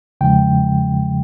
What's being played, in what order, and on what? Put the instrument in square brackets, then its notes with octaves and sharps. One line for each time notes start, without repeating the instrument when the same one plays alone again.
[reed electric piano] E2 C#3 F3 G#3 G5